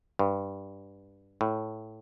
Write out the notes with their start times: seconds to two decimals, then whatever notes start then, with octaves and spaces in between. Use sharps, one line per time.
0.19 G2
1.41 A2